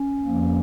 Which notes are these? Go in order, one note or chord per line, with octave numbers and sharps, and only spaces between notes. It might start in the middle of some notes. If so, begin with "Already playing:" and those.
Already playing: C#4
F2 F3 A#3